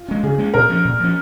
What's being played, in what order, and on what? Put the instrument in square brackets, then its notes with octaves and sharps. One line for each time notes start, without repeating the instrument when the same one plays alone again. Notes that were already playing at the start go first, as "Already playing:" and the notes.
Already playing: [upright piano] F4
[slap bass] G#3 C#4
[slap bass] C#3 [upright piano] G#4
[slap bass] G#3 C#4
[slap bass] A#2 [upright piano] A#4
[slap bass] F3 C#4
A#2
F3 C#4